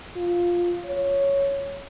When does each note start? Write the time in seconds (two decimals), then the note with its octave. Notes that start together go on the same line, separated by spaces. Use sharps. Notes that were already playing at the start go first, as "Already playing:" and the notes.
0.17 F4
0.85 C#5